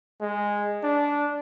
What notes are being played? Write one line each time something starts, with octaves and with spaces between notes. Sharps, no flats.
G#3
D4